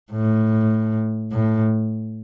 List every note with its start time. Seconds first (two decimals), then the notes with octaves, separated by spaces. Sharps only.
0.12 A2
1.32 A2